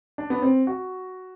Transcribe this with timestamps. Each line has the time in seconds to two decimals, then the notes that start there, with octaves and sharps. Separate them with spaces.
0.18 D4
0.30 B3
0.42 C4
0.67 F#4